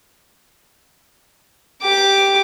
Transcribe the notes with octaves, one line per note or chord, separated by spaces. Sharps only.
G4 D6